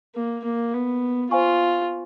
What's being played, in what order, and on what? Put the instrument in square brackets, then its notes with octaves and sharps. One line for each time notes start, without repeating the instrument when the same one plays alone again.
[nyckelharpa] A#3
A#3
B3
[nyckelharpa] F4 [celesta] C5 F5 G#5 C#6